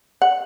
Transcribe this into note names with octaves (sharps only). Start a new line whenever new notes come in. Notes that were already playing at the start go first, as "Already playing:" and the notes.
F#5